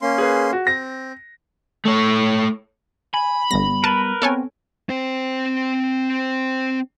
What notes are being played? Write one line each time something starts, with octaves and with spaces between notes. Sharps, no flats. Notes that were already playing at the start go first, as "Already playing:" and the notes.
A#3 C#4 C6
G#4 B4
F#4
C4 A#6
A3 C#5
G#5 B5
G1 G3 B3 A#6
A#4 B4 A5
B3 C4 A4 C#5 G#5
C4 C5